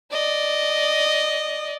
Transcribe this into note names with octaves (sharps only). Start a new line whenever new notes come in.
D5 D#5